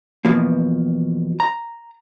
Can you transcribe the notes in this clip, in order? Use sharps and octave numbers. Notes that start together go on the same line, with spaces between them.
B1 E2 B2 F3 A#3
A#5